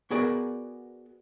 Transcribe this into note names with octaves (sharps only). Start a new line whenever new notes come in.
B3 F#4 G#4 A#4 D5